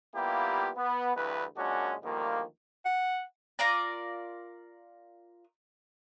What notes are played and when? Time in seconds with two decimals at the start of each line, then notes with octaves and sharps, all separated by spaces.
0.16 G3 A#3 B3 E4 F4 G4
0.77 B3
1.17 D2 G2 E3 B4
1.57 F#2 A#2 G#3 C#4 D4 F#4
2.04 D2 D#3 F3 G3 A#3
2.85 F#5
3.59 F4 A#4 D5 A#5